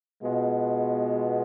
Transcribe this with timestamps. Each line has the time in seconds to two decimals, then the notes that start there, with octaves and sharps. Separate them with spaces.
0.22 B2 G#3 B3 F4